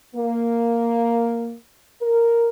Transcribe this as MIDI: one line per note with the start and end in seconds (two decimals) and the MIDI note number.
0.16 1.55 58
2.01 2.49 70